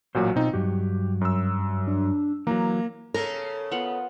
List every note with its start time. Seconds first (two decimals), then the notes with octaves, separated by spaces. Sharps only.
0.15 A1 A#2 F#3 F#4 C5
0.36 B2 C4 D#4 F4
0.54 G2 F#3 G4
1.21 F#2 E6
1.87 D4
2.47 E3 F#3 A#3 A#5
3.14 C#3 C#4 A4 A#4
3.71 B3 F4 F#5